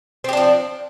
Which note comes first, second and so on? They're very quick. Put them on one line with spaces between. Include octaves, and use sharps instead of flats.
C4 G4 D4 F3